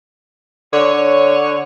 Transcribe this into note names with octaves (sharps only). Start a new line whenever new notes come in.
D3 C#5